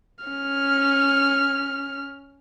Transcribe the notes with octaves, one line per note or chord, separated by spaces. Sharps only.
C#4 F6